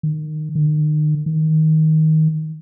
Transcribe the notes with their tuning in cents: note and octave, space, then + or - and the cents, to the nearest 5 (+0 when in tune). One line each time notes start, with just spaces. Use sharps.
D#3 -20
D#3 -40
D#3 +15